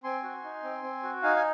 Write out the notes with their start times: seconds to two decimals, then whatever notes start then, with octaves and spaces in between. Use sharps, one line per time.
0.04 C4 G#5 C6
0.23 F#4
0.44 D#4
0.63 C4
0.83 C4
1.03 F#4
1.23 D#4 F5 G#5
1.36 G#5